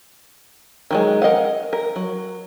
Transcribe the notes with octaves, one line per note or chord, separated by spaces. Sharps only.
D#3 F#3 G#3
A#4 D#5 F5 F#5
A#4
F#3